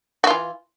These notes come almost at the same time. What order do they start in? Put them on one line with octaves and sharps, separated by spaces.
F#4 F4 E3